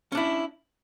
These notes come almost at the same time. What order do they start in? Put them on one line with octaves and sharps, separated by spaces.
C#4 D4 E4